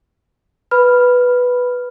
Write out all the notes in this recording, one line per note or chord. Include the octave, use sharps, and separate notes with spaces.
B4 B5 F6